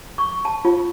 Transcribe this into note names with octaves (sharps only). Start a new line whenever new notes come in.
C#6
A5
F4